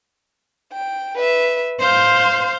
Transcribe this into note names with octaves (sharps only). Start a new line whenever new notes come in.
G5
B4 E5
C5 F5 C6 G6